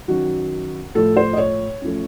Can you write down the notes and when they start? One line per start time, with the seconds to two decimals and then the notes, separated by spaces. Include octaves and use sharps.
0.08 F#2 D#3 F#3 F#4
0.95 A2 F3 A3 A4
1.17 C5
1.33 D#5
1.38 C#5
1.81 F#2 F3 A3